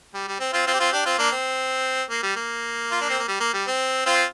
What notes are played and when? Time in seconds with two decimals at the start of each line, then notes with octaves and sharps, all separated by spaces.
0.14 G3
0.28 G3
0.40 C4
0.53 C4 F4
0.67 C4 F4
0.74 G4
0.80 C4 F4
0.92 D4 G4
1.05 C4 F4
1.18 A#3 D4
1.32 C4
2.10 A#3
2.23 G3
2.36 A#3
2.91 F4
3.01 D4
3.10 C4
3.19 A#3
3.28 G3
3.40 A#3
3.54 G3
3.67 C4
4.06 C4 F4